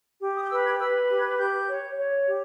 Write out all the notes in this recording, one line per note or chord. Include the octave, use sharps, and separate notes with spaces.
G4
D#6
G6
B4 E6
G#6
B4 E6
G4
G#6
G4 G6
C#5
C#5
G4